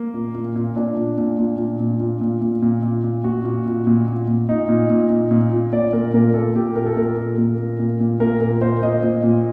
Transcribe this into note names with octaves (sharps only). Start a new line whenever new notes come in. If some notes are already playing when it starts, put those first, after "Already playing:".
Already playing: A#3
A#2
A#2
A#2
A#2 D4
A#2
A#2
A#2
A#2
A#2
A#2
A#2
A#2
A#2
A#2
A#2
A#2 F#4
A#2
A#2
A#2
A#2
A#2
A#2 D#4
A#2
A#2
A#2
A#2
A#2
A#2 D5
A#2 A#4
A#2 A#4
A#2 A4
A#2 G4
A#2 A#4
A4
A#2 A#4
A#2
A#2
A#2
A#2
A#2
A#2 A#4
A#2 A#4
A#2 C5
A#2 D#5
A#2
A#2